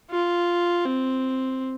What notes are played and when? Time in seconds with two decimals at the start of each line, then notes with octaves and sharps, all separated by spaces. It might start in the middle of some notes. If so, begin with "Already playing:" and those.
0.10 F4
0.85 C4